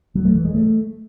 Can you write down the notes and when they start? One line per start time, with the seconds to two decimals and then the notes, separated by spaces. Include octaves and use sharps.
0.15 F#3
0.25 A3
0.35 E3
0.45 G#3
0.55 A3